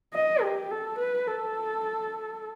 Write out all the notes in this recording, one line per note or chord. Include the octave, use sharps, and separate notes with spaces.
D#5
G4
A4
B4
A4